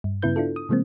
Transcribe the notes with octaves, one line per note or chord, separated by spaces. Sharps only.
G2
G2 C#3 B3 E4 B4 G6
D4 E4 F4 A4
D#6
C3 E3 G#3 A#3 C4